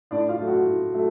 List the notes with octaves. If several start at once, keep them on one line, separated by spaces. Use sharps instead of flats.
A2 D4 D5
F4 F5
F#3 A3
F#4 F#5
A2
F#3 A3